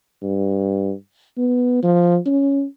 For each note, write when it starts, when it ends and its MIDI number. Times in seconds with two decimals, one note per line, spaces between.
0.22 0.93 43
1.37 1.80 59
1.83 2.18 53
2.26 2.65 61